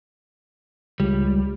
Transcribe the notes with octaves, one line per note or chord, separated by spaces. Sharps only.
C#2 G3